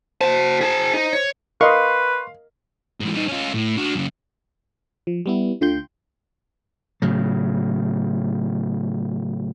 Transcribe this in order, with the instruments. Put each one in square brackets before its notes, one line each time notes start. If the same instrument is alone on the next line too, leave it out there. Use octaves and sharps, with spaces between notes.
[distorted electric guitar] F#4 A5 [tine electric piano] C5
[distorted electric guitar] G#4 A5
D#4
C#5
[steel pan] A#4 D#5 [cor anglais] B4 [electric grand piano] F5 [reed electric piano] C6 C#6
[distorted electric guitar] G#2 E3
G3 D#4
C#4 F4
A2
D4 F#4
F#2 C#3
[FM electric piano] F3
G3 B3 E4
D2 D3 F4 G5 C6 G6
[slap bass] A2 C#3 F#3